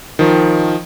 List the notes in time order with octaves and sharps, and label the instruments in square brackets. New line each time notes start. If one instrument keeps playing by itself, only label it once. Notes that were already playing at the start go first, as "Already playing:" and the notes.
[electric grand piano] D#3 F3